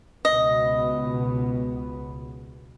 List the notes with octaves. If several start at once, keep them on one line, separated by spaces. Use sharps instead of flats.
C#2 B2 B3 D#5